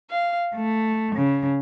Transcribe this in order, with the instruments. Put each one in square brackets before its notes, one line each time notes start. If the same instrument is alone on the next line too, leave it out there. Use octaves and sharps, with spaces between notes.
[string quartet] F5
A3
C#3